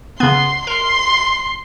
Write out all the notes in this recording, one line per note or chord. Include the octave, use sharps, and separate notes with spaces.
C#3 B3 C6
A#4 C6